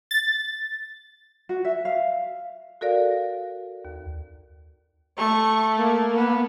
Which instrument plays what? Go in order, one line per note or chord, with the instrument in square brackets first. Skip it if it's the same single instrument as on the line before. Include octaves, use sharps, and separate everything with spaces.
[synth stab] A6
[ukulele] F#4
E5
F5
[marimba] F#4 A4 A#4 D5 F5
D#2
[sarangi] A3 [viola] C#6
[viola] A#3
[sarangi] B3